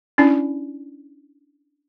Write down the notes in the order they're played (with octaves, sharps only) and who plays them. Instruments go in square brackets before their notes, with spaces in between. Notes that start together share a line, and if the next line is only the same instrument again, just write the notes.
[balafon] C#4 D4 E4 D5